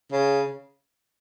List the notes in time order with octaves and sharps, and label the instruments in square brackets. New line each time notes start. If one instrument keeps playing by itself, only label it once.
[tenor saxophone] C#3